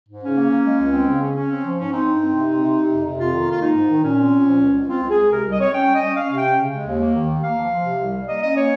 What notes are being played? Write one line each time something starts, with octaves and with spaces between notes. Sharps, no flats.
G#2
C#3 C#4
A#3
A#3
G#3
C#2
C4
C#3
C#4
C#4
C4
F3
G#2 C#4
C4 D#4
G2
C4
C3
C4
C3
C3
F2
C3
F2 F4
D#3
A#3 F4
G#3 D#4
G#2
D#3
A#2 C#4
C4
A#2
F3
C#2
C#2
C4 F4
C#2
G#4
C#2
C3 A#4
C2
D#5
C4 C#5
C#4 G5
G3
D#5
C#4
C#4 F5
C3 F5
G5
C#4
C#3
G#3
D#2
A#3
D#3
D#2
A#3 F5
F3
F3
C3
C2
G3
A#3 D#5
C#4 D#5
A#3 C#5